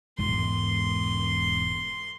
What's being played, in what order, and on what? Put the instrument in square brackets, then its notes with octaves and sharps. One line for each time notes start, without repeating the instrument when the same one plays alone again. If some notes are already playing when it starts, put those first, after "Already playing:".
[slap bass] E1 G#2 G#3 [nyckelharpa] C6